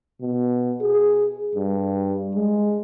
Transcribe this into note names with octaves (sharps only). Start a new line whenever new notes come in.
B2
G#4
G2
G#3